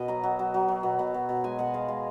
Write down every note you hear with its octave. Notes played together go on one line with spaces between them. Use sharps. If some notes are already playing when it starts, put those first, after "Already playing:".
Already playing: B2 D#5
F#3 A#5
F#3
F#3
F#3
F#3
B2
B2
B2
B2
G#3 G#5
B2 F#5
G#3 F5
G#3 D#5